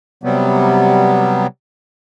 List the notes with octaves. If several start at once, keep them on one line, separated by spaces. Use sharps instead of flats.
C3 F#3 G3 B3